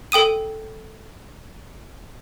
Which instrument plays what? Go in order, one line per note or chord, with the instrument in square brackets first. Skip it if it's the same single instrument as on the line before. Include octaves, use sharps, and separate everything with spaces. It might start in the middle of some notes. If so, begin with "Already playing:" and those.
[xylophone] A4 G5 D#6 D#7